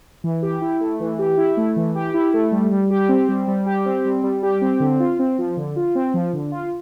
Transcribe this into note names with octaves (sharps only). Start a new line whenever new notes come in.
E3
G4
E4
A3
E3
G4
E4
A3
E3
G4
E4
A3
G3
G3
G4
C4
G3
G3
G4
C4
G3
G3
G4
C4
D3
F4
C4
F3
D3
F4
C4
F3
D3
F4